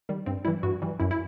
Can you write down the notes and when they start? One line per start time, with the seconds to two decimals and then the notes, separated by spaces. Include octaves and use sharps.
0.09 D#3 G3
0.26 G2 C4
0.45 E3 G3 E4
0.63 G2 F#4
0.82 E3 G3
1.00 F#2 E4
1.11 E4